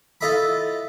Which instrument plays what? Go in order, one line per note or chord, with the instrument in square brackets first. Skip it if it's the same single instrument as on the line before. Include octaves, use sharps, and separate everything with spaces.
[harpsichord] E4 F4 A4 D#5 E5 B5